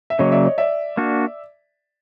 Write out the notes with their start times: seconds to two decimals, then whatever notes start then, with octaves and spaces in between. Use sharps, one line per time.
0.10 E5
0.19 C#3 F#3 A#3 C#5 D#5
0.32 D5 E5
0.45 C#5 D#5
0.58 D5 E5
0.97 A#3 D4 F#4